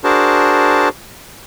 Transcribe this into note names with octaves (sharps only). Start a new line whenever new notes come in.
D4 F#4 G#4 A#4 C5 A5